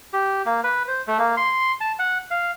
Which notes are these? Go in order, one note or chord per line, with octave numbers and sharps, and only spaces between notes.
G4
A#3
B4
C5
A3
A#3
C6
A5
F#5
F5